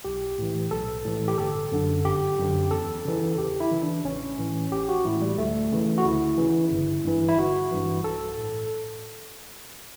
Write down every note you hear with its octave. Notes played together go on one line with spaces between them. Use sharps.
B1 G4
A2 E3
B1 A4
A2 E3
G4
G1 A4
F#2 D3
G1 G4
F#2 D3
E2 A4
C#3 E3
E2 G4
E4
C#3 E3
D4
A1 C#4
A2 E3
A1 G4
F#4
A2 E3 E4
G3
D2 A3
C#3 E3
F#4
D2 E4
C#3 E3
G1
G2 E3
E4
G1 F#4
G2 E3
B1 A4
A2